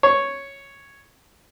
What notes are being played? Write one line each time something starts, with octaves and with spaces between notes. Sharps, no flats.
C#5